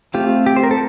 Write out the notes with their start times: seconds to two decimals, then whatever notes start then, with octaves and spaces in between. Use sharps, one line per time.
0.14 A3 C4 F4 G4
0.46 G4
0.56 C5
0.63 A#4
0.71 A4